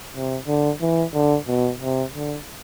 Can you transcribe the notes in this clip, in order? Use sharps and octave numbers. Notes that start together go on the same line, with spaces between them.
C3
D3
E3
D3
B2
C3
D3